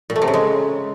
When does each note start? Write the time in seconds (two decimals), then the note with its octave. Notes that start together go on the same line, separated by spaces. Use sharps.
0.10 A#2
0.16 A3
0.22 C3
0.28 C#3
0.34 G#3